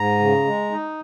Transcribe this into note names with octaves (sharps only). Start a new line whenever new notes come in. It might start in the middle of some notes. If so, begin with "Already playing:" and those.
Already playing: G#2 A#5
C#3
G#3
D#4